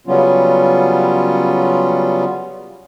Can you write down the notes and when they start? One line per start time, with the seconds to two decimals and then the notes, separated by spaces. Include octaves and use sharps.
0.07 C#3 F#3 G3 B3 C#4 F4